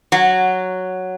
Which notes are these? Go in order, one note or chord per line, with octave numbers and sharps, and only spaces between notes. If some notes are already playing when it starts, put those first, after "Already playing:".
F#3